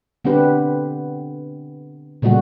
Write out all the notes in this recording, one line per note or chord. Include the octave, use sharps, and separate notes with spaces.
D3 B3 C4 D4 G4 B4
A#2 C#3 G3 A3 F#4